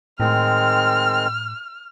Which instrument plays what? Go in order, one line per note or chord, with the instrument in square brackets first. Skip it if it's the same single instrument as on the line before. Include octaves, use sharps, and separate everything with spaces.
[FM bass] A2 [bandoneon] D#3 G#3 C4 [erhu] F6